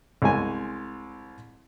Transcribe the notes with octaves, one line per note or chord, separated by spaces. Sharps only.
C2 G#3 G#5